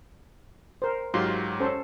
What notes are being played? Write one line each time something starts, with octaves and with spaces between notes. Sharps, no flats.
A#4 C5
G#2 F#3 F4 G4 C6
C#4 A4 C5